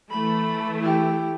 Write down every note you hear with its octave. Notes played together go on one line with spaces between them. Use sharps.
E3 A3 B5
E4 G4